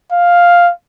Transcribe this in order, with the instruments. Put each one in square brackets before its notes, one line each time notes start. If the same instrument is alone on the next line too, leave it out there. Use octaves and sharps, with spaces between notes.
[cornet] F5